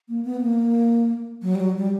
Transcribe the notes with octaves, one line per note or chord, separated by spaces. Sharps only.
A#3
B3
A#3
F#3
G3
F#3
G3